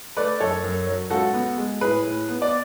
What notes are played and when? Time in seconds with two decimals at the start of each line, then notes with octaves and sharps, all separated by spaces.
0.17 A3 B4 D5
0.40 F#2 A4 C#5
0.63 F#2
0.87 F#3
1.10 C#2 F#4 A4
1.34 B3
1.58 G#3
1.81 A2 G#4 B4
2.05 A2
2.29 B3
2.42 D5